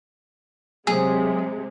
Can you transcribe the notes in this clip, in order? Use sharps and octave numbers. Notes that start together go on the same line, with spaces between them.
C3 F#3 G#3 G#4